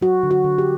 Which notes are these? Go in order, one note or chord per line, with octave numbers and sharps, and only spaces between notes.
F#3 F#4
D3
F#4
D3
G4